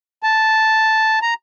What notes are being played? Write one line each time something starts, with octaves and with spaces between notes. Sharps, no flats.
A5
A#5